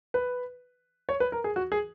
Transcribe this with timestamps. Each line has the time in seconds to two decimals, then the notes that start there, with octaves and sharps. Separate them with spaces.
0.14 B4
1.09 C#5
1.20 B4
1.32 A#4
1.44 G#4
1.56 F#4
1.72 G#4